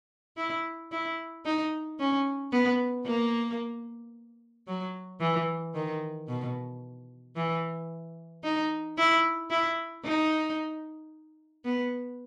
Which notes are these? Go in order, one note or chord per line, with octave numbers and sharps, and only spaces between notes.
E4
E4
D#4
C#4
B3
A#3
F#3
E3
D#3
B2
E3
D#4
E4
E4
D#4
B3